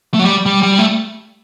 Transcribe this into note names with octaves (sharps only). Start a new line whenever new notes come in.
A3
F#3
G3
G3
G3
A3